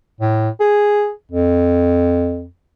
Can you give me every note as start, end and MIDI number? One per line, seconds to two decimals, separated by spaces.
0.21 0.49 45
0.60 1.11 68
1.31 2.46 41